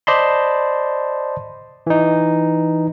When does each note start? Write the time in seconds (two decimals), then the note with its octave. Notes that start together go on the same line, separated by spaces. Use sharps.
0.07 C5 D5 D#5 A5 B5 C6
1.87 E3 D#4